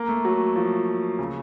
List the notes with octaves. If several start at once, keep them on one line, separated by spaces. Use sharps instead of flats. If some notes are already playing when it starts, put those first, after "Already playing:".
Already playing: A#3
A3
F#3
F3
C#3